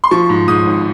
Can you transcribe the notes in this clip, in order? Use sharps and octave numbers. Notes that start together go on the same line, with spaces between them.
C6
F3 C#6
G#2
G#2 D#6
G#1